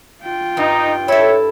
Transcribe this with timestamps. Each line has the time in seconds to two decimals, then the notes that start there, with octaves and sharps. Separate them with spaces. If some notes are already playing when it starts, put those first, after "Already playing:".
0.23 F4 G5
0.57 G2 D#4
1.08 E4 A4 C#5 E5